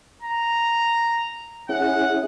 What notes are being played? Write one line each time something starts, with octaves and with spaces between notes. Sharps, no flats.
A#5
C#4 E4 G#4 F#5